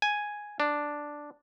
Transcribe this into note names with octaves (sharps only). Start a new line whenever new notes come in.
G#5
D4